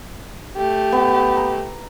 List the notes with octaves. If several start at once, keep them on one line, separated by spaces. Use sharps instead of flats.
A3 G4
B3
A#5